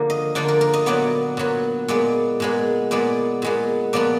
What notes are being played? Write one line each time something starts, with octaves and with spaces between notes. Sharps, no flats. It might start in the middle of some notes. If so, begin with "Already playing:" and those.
Already playing: D3 F3 A#3
D#5
D3 F3 A#3 D5
A#4
A#4
D#5
A#2 F#3 B3 D5
A#2 F#3 B3
A#2 G#3 B3 D5
A#2 G#3 B3
A#2 G#3 B3 D5
A#2 G#3 B3
A#2 F3 B3 D5